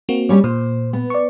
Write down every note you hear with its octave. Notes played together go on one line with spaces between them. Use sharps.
A#3 C4 F#4
G3 C#4 C#5
A#2 C5
B3
D5 C#6